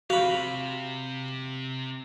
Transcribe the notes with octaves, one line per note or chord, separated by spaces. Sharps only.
C3 F#4 F5 B5